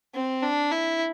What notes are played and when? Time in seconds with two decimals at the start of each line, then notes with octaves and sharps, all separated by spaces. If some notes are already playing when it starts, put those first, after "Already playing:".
0.15 C4
0.43 D4
0.72 E4